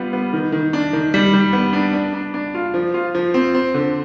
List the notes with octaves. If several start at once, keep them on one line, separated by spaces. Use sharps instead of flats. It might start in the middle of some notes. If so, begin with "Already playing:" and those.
Already playing: G3 B3 F4
B3
D#3
D#3
D4
D#3
G3
G3
B3
D4
D4
D4
D4
F4
F3
F4
F3
C4
C4
D3